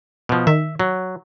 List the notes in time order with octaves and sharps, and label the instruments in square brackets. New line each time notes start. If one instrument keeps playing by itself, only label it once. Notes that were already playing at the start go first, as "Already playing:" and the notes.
[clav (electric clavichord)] B2 F3
[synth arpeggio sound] D#3 [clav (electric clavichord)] E5
[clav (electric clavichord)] F#3